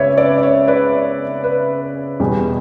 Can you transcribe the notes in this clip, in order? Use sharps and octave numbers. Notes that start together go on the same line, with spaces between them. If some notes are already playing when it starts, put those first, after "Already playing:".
Already playing: C#2 C#3 B3 B4 C#5 D5 E5
B4 D5
D5
C#5
B4 D5
B4
E2 B2 G3 B3